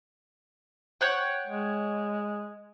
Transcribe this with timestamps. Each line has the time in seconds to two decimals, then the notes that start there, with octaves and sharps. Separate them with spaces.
1.01 C#5 F#5 G5
1.47 G#3